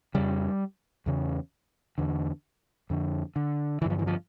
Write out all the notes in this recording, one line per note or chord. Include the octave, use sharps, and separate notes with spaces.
F2 C#3 G3
E2 C#3
E2 D3
F2 D3
D3
G2 D3 E3 F3
E3
F3